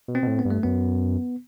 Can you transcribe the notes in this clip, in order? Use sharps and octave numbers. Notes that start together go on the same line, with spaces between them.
B2
C4
B2
A2
B3
G2
A3
F#2 B3